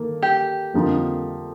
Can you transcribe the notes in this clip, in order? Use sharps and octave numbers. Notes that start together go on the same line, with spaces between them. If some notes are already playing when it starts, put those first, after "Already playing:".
Already playing: D#3 A#3 A4
G4
F2 D3 F3 A#3 D#4